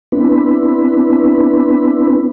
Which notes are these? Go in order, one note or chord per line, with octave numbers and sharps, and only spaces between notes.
B3 C4 D4 E4 B4